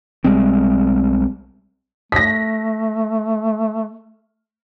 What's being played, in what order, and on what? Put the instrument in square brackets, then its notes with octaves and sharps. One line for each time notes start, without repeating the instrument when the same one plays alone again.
[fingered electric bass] B1 G3 G#3 C4
[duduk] A3 [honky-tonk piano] A#6 B6